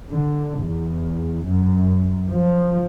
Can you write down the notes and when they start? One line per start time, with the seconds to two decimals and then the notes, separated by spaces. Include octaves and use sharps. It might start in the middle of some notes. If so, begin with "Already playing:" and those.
0.11 D3
0.60 E2
1.47 F#2
2.33 F3